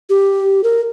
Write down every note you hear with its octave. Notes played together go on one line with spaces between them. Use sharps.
G4
A#4